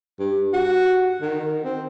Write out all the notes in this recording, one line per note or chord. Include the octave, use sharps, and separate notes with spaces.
G2
F#4
D#3
C4